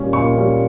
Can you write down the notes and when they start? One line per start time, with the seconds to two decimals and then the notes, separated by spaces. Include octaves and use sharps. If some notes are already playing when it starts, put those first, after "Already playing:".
Already playing: A#2 G3 C#4
0.13 A#2 C#6
0.36 G3 C#4